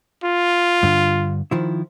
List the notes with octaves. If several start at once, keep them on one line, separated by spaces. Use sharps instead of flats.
F4
G2 D3
D#3 F3 E4